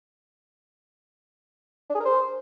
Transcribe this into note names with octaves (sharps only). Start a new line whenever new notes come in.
D4
G#4
A#4
C5